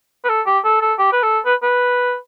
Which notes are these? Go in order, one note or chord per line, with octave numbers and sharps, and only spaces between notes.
B4
A4
G4
A4
A4
G4
B4
A4
B4
B4